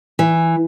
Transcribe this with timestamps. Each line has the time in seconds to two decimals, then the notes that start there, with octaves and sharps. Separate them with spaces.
0.19 E3